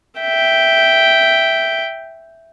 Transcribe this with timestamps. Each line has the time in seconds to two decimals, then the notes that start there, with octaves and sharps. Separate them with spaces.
0.20 E5 G5